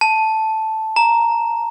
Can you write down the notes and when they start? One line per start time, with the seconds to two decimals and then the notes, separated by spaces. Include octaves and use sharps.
0.01 A5
0.96 A#5